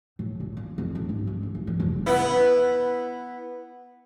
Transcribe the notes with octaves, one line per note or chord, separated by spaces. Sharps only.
A2
A#2
A#3
F2
A1
G#2
E3
D2
G#1
E3
F1
B3 E4